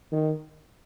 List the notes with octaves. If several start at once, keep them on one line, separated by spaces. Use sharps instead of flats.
D#3